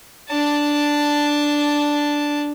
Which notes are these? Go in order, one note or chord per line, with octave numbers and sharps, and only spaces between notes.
D4 A5